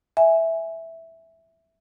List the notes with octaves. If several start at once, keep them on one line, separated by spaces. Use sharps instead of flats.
E5 G#5